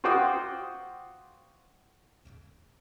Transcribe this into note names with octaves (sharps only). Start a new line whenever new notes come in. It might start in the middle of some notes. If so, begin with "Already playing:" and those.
F4 F#4 C5 G5 D6 D#6